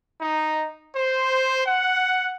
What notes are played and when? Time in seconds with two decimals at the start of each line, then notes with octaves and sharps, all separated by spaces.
0.21 D#4
0.95 C5
1.66 F#5